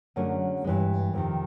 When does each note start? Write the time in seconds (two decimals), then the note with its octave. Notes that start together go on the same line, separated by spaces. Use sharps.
0.16 F#2 D3 F#3 A3 C#4 G#4
0.64 G2 E3 G#3
1.14 F2 C3 D#3